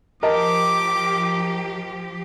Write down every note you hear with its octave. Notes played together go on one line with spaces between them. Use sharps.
F3 G4 A#4 D#5 A5 D6